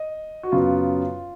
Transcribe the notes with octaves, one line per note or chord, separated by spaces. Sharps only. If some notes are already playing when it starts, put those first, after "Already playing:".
Already playing: D#5
F#4
F#2 C#3 F#3 B3 F4